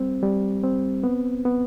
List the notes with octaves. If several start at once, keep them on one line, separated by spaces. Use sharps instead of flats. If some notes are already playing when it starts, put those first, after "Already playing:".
Already playing: G3 C4
G3
C4
B3
B3